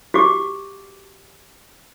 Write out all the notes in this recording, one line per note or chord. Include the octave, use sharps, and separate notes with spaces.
F#4 G4 D6